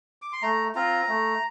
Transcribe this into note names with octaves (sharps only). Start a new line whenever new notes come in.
D6
C6
A3 A#5
C4 F4 A#5
A3